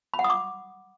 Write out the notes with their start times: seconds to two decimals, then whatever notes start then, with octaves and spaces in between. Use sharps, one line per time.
0.14 B5
0.19 F#5
0.24 D#6
0.30 D6